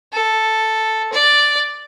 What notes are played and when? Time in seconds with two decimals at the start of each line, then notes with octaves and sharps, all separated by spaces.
0.13 A4
1.13 D5